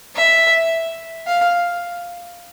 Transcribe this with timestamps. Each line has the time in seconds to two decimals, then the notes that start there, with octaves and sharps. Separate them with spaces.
0.16 E5
1.27 F5